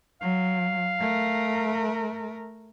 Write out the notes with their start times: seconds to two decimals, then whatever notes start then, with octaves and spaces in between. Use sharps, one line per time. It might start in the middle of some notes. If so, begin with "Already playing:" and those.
0.21 F#3 F5
1.01 A3 A#4